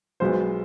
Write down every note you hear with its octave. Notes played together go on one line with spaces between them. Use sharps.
B1 B2 G#3 B3 C5